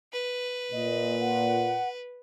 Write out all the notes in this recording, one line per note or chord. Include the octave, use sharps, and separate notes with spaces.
B4
A#2 D#5
F#5